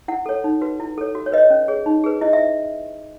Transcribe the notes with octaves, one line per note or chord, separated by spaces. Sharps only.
E4 F#5
A4 C#5
D#4
F#4 B4
E4
A4 C#5
F#4
C#5
B4 D#5
C#5
C#4
G#4 C#5
D#4
G#4 B4
E4 D#5
E5